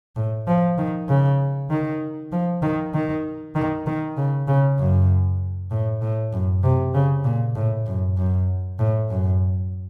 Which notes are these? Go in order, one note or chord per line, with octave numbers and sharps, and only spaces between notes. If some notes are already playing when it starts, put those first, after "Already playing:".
A2
F3
D#3
C#3
D#3
F3
D#3
D#3
D#3
D#3
C#3
C#3
F#2
A2
A2
F#2
C3
C#3
A#2
A2
F#2
F#2
A2
F#2